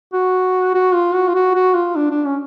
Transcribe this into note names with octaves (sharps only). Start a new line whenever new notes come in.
F#4
F#4
F4
F#4
F4
F#4
F#4
F4
D4
D4
C#4